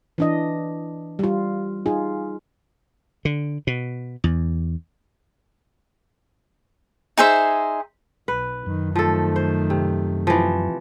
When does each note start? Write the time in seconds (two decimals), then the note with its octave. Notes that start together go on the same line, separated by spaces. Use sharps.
0.18 E3 D4 D#5
1.19 G3 F4
1.86 D#4 F4 G#4
3.25 D3
3.67 B2
4.24 E2
7.18 D#4 G#4 C5 E5
8.28 B1 B4
8.66 F#2 D#3
8.96 D#3 F3 A3 A4
9.36 C5
9.70 C3
10.27 E3 F3